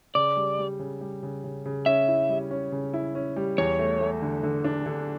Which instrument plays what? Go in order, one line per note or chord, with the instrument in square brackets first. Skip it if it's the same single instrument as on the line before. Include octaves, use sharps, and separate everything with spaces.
[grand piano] C#3 [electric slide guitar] D5
[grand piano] G3
G3
C#3
G3
C#3
C#3
C#3
[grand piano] C#4 [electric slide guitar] E5
[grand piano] E4
G3
C#4
C#3
E4
C#4
G3
[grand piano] E2 [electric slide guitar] C#5
[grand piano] A3
A3
D3
D3
D4
D3